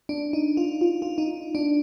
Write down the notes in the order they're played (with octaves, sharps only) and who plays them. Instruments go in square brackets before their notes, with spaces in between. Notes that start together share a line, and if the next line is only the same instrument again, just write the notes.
[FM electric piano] D4
D#4
F4
F4
F4
D#4
D4